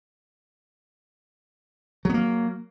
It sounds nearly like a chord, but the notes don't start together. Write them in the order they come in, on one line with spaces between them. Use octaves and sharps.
F#3 B3 A#3